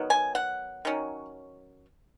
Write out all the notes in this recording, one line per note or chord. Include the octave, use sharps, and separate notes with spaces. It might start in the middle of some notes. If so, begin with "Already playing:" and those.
Already playing: D#3 F#3 B3
G#5
F#5
D#3 F#3 C#4